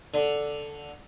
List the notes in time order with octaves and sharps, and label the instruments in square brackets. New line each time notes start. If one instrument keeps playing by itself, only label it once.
[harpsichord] D3